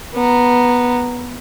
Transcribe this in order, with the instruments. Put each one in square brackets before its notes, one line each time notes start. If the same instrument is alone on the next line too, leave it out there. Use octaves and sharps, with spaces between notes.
[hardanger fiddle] B3 A#5